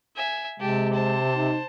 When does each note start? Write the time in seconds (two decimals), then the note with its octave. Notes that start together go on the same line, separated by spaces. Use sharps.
0.16 E5 G#5
0.60 C3 G#3 G4 A5
0.93 C5 A5
1.35 D#4